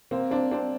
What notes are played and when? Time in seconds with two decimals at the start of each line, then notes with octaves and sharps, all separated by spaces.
0.11 A#3 C4
0.31 C4 D4
0.51 C4 D4